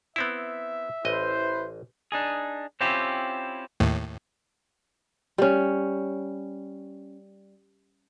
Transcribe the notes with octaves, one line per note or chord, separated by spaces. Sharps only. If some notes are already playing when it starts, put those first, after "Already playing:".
B3 C4 E4 E5
A1 E4 B4 C5 D#5
D4 D#4 G#4
C4 C#4 E4 F4 G4
D#2 A2
G3 C#4